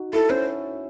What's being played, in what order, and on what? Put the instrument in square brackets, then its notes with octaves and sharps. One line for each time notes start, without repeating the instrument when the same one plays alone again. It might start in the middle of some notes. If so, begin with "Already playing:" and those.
Already playing: [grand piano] D#4 F#4
[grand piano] E4 [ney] A4
[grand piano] C#4 [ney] C5